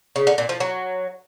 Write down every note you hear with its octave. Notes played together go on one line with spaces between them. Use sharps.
C#3
D3
A#2
F3
F#3